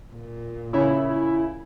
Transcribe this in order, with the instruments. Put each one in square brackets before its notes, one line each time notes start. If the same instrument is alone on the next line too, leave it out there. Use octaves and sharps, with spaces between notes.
[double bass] A#2
[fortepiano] C#3 C#5 [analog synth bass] E4